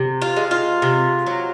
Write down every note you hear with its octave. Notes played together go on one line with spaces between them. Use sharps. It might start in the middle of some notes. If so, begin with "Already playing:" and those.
Already playing: C3
F4
G#3
F4
C3
F#3